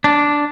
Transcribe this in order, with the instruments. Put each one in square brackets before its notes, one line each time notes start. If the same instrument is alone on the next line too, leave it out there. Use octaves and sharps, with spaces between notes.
[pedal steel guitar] D4